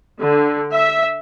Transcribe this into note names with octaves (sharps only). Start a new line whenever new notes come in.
D3
E5